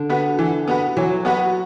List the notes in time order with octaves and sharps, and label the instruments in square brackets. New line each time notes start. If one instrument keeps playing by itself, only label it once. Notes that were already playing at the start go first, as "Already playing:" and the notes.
Already playing: [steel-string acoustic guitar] D3
[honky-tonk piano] B3 F#4 B4
E3
B3 F#4 B4
[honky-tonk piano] E3 [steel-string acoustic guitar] F#3
[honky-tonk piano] B3 F#4 B4